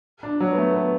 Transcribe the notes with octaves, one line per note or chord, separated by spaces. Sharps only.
D4
F#3
B3
A3
B3